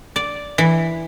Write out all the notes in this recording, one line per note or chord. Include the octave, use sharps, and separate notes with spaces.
D5
E3